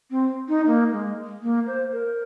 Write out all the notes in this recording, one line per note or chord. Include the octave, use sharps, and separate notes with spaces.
C4
D#4
A#3
G#3
A#3
C5
A#4